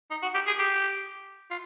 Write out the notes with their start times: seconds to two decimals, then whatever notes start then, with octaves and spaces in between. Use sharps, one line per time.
0.11 D#4
0.22 F#4
0.34 G4
0.47 G#4
0.59 G4
1.50 F4